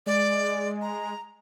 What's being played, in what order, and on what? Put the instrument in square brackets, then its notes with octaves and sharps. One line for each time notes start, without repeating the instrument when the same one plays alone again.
[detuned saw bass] G#3 [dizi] D5
[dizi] A#5